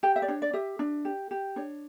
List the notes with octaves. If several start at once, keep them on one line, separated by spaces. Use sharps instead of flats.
G4 G5
E5
D5
D4 C#5
D5
G4 E5
D4
G4
G4
D4 C#5